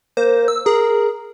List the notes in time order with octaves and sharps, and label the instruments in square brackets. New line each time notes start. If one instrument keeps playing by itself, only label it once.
[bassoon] A#3 [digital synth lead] C5
[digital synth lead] E6
[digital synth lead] G#4 [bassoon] A#4